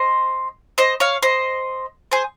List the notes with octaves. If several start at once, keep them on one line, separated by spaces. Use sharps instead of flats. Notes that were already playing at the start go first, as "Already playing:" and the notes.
Already playing: C5 D#5
C5 D#5
C#5 F5
C5 D#5
G#4 C5